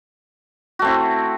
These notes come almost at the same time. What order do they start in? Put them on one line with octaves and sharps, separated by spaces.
F#4 A3 C4 E4